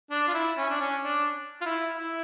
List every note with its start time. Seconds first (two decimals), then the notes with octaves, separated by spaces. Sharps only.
0.11 D4
0.28 F4
0.34 E4
0.58 C#4
0.70 D4
0.81 C#4
1.04 D4
1.61 F4
1.66 E4
1.97 E4